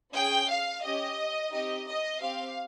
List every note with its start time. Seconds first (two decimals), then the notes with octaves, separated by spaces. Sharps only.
0.13 C#4 G#4 G5
0.48 F5
0.82 C#4 G4 D#5
1.51 C4 D#4 G4 D#5
1.86 D#5
2.20 C4 G4 F5